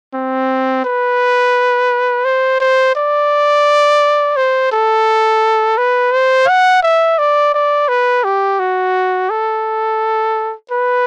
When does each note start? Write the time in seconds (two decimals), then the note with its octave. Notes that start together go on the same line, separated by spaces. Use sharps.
0.14 C4
0.84 B4
2.25 C5
2.60 C5
2.95 D5
4.36 C5
4.72 A4
5.78 B4
6.12 C5
6.48 F#5
6.83 E5
7.18 D5
7.54 D5
7.89 B4
8.24 G4
8.59 F#4
9.30 A4
10.71 B4